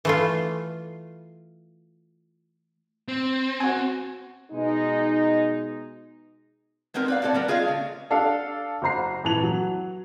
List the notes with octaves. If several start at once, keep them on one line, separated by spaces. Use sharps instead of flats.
E3 A3 F4
C4
F#4 G#5
B2 G#3 D#4
G#3 B3 C4 D#4 A#4
B4 D5 F5
A2 G3 C4 A4 D5
G3 B3 A#4 B4
F4 G#4 D#5 F5
C#3 A3
D4 A4 D5 F5
F#1 F#4 C5 A#5 C7
D#1 E3 A5 F7 F#7
F#3